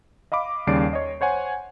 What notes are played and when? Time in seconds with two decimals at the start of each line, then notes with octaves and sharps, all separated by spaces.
0.32 D#5 F5 B5 D6
0.67 D#2 C#3 G3 D5 C7 D7
0.93 C#5 D#5
1.21 C5 C#5 F#5 G#5